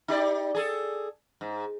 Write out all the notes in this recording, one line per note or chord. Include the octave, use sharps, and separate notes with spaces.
D#4 G4 D5
G#4 A4
G#2